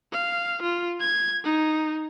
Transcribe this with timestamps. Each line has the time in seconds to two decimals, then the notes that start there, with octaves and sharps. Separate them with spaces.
0.12 F5
0.62 F4
1.00 G#6
1.44 D#4